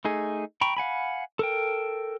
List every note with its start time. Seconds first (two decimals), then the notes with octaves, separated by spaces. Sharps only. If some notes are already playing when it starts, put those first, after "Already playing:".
0.05 A3 D#4 G#4
0.61 G5 A#5 B5 C#6
0.77 F5 F#5 G#5 B5
1.39 A4 A#4 G5